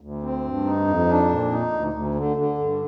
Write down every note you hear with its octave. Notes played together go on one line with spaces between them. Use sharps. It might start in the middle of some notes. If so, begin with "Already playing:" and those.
D2
C4
G2
D#4
F2
D4
A#2
D#4
D2
D2
D3
D3
G2